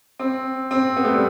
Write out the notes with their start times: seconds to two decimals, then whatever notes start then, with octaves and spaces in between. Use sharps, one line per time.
0.19 C4
0.71 C4
0.97 B3
1.04 A3
1.13 G3